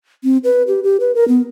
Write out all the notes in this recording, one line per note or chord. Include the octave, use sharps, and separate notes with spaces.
C4
B4
G4
G4
B4
A#4
B3